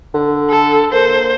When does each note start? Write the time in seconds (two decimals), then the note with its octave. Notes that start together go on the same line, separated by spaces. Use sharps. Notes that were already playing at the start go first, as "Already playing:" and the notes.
0.14 D3
0.50 A4
0.92 A#3 C5